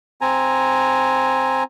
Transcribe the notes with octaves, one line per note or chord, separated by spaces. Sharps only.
C4 G#5 A#5